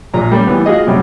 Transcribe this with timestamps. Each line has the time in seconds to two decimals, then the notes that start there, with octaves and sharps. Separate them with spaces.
0.14 A#1 A#2 A#5
0.31 G3 A#3 C#4
0.47 E3 G3 B3
0.66 F4 F#4 G#4 D#5
0.87 F#2 C3 F#3 G3 C#4